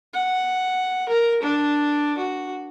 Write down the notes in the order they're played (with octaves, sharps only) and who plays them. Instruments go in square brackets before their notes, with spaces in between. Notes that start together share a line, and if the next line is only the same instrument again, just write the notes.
[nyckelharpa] F#5
A#4
D4
F#4